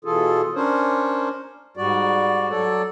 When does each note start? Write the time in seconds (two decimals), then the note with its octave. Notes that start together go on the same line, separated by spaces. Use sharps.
0.05 B2 E3 F4 G#4 A4
0.55 C#4 D4 A#4 C5 C#5
1.77 G#2 G3 F#4 D5
2.50 F#3 A4 C#5 D5